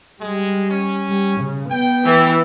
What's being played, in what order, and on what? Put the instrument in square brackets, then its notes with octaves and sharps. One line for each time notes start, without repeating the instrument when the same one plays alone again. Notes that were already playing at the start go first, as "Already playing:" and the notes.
[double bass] G3 [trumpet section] G#3
[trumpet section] C#4
[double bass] G3
C#3
[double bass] B3 [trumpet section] G5
[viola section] E3